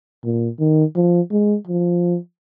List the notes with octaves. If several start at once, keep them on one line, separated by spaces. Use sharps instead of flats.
A#2
D#3
F3
G#3
F3